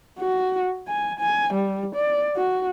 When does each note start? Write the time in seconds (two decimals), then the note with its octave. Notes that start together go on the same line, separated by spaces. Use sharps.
0.19 F#4
0.88 G#5
1.20 G#5
1.54 G3
1.95 D5
2.36 F#4